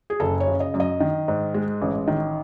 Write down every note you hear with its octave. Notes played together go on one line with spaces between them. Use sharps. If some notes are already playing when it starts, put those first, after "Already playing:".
G#4
F#1 A4
C#5
C#3
D#5
F#2
D#5
D#3
G#2
G#3
A1
D#3